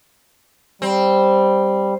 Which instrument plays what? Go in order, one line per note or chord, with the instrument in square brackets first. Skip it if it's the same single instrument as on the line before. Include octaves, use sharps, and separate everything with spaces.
[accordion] G3 [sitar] C4